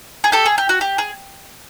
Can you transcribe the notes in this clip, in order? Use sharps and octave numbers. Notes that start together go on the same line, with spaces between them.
G#4
G4 A4
G#4
G4
F#4
G4
G#4